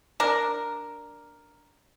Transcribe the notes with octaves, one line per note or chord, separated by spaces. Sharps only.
D4 A#4